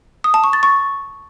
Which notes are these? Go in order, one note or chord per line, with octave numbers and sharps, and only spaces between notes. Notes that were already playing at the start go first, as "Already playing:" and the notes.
D#6
A5
C#6
A6
C#6